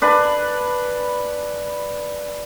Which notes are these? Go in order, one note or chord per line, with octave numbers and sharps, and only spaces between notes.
D4 B4 G#5